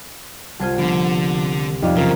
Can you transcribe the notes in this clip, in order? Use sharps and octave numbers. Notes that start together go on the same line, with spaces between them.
C2 F4 C5 A5 G#6 D#7
D3 F3 B3
F2 D#4 G4 D5 D#5 F5
F#2 C#3 F4 A#4 F5 G#6